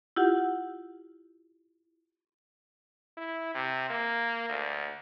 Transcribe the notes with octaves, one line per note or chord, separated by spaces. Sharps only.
E4 F4 G4 F#5
E4
C3
A#3
D2